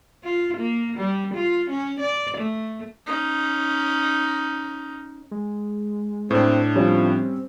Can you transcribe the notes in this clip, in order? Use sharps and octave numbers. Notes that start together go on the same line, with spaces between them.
F4
A#3
G3
F4
C#4
D5
A3
C#4 D#4
G#3
A2 C4 D4
F3 G3 C4 C#4 C#5